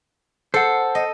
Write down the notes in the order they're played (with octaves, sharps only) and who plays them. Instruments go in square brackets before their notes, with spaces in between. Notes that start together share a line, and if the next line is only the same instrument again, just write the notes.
[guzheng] A4 [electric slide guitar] C5 F#5
[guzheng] D#5